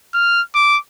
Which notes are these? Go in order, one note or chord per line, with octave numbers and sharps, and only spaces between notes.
F6
D6